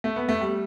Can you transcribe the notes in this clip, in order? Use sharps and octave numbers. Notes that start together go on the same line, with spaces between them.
A3
B3
A3
G3